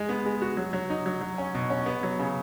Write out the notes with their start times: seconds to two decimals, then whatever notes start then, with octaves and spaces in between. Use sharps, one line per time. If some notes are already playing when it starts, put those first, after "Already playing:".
Already playing: G#3
0.09 B3
0.25 G#3
0.42 F#4
0.57 F#3
0.73 F#3
0.90 D#4
1.06 F#3
1.21 F#3
1.38 C#4
1.55 B2
1.70 C#4
1.86 B3
2.03 F#3
2.19 C#3